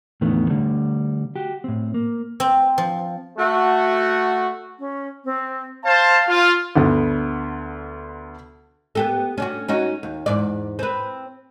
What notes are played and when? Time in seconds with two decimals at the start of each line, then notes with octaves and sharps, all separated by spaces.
0.21 E2 A2 D3 D#3 A3 B3
0.50 D3 G3 A3
1.36 F#4 G4
1.64 A2 C4
1.94 A#3
2.40 C4
2.78 F3
3.38 A3 F#4
4.79 C#4
5.25 C4
5.84 C5 F5 A5
6.29 F4
6.76 D2 D3 B3
8.95 B3 G4 A4
9.38 C#4 D4 F#4
9.68 C#4 D#4 F#4
10.03 D#2
10.26 E2 G#2 D5
10.79 C4 B4